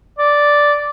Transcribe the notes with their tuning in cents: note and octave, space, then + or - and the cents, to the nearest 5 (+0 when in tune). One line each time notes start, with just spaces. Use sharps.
D5 -5